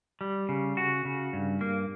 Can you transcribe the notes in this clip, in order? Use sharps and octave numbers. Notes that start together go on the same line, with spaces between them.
G3
C#3
F#4
C#3
G2
A#3